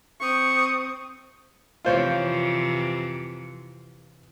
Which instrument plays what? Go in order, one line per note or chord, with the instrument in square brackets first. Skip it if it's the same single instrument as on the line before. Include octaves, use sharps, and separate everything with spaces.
[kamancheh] C4 D#6 [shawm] C#6
[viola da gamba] F2 C3 E3 [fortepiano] F4 C5 C#5